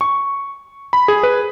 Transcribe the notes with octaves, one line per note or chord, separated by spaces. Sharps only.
C#6
B5
G#4
B4